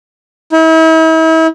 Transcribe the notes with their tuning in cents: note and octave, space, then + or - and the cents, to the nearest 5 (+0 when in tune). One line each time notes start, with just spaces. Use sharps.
E4 -40